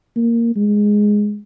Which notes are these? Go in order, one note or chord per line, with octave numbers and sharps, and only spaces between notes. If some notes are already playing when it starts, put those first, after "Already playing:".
A#3
G#3